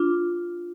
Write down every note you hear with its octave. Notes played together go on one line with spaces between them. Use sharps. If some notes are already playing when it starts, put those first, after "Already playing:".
Already playing: D4 F4